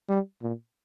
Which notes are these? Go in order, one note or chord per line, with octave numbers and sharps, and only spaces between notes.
G3
A#2